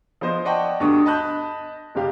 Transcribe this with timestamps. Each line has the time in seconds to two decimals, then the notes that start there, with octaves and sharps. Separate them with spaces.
0.21 F3 B3 C5 D#5
0.45 D5 D#5 F#5 G5 A5 C#6
0.80 D2 G2 B3 D4 C#6 D#6
1.06 D#5 A5 B5 D#6 F#6 G6
1.95 F#1 C3 G4 F5